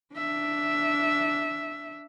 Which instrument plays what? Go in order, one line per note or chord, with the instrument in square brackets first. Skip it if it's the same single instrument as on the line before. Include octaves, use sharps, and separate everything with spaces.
[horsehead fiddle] D4 E5